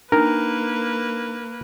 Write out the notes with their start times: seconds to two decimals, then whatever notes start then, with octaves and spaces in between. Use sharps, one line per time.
0.12 A#3 D4 D#4 A#4 B4